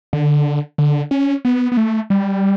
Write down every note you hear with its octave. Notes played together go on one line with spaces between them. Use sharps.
D3
D3
C#4
B3
B3
A3
G3